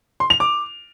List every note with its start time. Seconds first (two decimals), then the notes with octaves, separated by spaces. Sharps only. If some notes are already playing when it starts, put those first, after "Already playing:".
0.20 C6
0.30 F7
0.40 D6